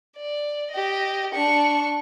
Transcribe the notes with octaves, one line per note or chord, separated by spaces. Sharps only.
D5
G4 D#5
D4 C#6